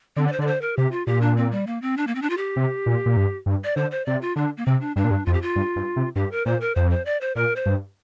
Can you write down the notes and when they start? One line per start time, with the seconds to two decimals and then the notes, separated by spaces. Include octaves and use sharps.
0.17 D3 C4
0.27 D5
0.32 C5
0.39 D3 D5
0.47 C5
0.61 A#4
0.77 C3 G4
0.91 F4
1.07 A#2 G4
1.21 D4
1.37 C4
1.51 G3
1.67 A#3
1.82 C4
1.97 D4
2.07 A#3
2.15 C4
2.22 D4
2.30 F4
2.37 G4
2.56 C3
2.86 A#2
3.06 A#2
3.17 G2
3.46 G2
3.64 D5
3.76 D3 C5
3.91 C5
4.06 C3 D5
4.21 F4
4.36 D3 D4
4.57 A#3
4.66 C3 C4
4.81 D4
4.96 G2 D4
5.04 A#2
5.11 G2
5.26 F2 F4
5.33 G4
5.42 F4
5.56 G2
5.76 G2
5.96 C3
6.16 G2 G4
6.32 A#4
6.46 A#2 C5
6.61 A#4
6.76 F2 C5
6.91 C5
7.06 D5
7.21 C5
7.36 A#2 A#4
7.56 C5
7.66 G2